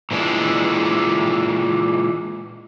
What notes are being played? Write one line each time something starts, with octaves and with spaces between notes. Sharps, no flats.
A#2 E3 G#3 D4